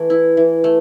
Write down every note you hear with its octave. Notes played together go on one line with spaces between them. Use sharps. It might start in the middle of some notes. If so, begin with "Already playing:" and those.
Already playing: E3 A3
E4
E3
A3